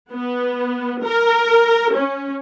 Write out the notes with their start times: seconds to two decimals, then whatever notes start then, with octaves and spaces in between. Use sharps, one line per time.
0.12 B3
1.04 A#4
1.93 C#4